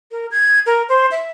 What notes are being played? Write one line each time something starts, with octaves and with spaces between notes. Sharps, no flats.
A#4
G#6
A#4
C5
E5